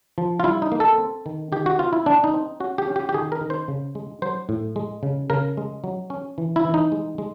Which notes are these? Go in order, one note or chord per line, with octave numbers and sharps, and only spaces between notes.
F3
F4
G3 E4
D#4
A#3
A4
C4
D#3
D#3 G4
F#4
C4 F4
E4
C4 D4
D#4
C4
C#4 F#4
G4
C#4
G4
G4
D#3 G#4
A#4
D#3
C5
C#3
G#3
F#3 C5
A2
G#3
C#3
C#3 A#4
G#3
F#3
C#4
E3
E4
E3
D#4
G#3
G#3